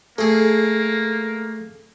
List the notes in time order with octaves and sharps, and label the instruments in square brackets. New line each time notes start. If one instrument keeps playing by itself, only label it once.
[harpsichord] A3 G#4 [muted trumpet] A#3 [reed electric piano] A4